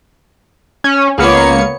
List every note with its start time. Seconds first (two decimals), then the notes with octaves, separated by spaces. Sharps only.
0.84 C#4
1.18 C#2 A#3 B3 C#5 C#7